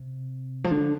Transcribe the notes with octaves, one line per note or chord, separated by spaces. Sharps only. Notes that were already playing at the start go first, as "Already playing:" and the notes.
Already playing: C3
F3
D3